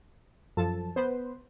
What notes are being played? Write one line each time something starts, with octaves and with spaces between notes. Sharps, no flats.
F#2 F3 A4 A5
B3 B4 C5